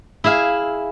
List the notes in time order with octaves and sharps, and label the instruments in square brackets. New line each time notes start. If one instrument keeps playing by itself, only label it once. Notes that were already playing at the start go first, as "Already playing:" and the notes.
[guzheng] E4 G#4 E5 F5